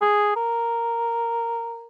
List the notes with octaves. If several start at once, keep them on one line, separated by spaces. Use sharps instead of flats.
G#4
A#4